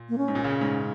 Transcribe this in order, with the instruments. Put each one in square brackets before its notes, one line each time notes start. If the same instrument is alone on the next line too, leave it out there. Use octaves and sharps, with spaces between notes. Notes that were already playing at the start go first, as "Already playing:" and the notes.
Already playing: [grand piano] A#2
[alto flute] A#3
C#4
[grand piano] G#2
A#2
C#3
A#2
G#2